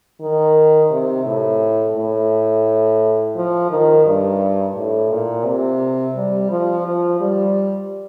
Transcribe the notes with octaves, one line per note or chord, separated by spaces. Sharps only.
D#3
C3
A2
A2
F3
D#3
G2
A2
A#2
C3
G3
F3
F3
G3